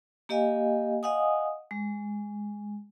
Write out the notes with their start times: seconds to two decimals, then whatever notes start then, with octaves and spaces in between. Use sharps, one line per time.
0.29 A#3 G4 D#5 F5 G#5
1.03 D#5 F5 F#5 G#5 D#6
1.71 G#3